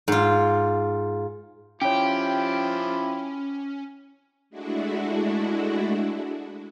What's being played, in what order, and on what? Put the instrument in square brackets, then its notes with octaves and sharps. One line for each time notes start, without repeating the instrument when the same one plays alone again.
[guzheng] G#2 F4
[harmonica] F3 E4 [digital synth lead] C#4 [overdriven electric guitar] G4 [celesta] C#5 G5
[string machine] G#3 A3 D4 E4 F#4